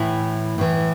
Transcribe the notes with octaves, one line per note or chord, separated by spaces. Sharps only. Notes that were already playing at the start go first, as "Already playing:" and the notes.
Already playing: A2 E3 E4
A2 E3